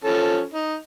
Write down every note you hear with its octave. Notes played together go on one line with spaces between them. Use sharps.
F3 C#4 A4
D#4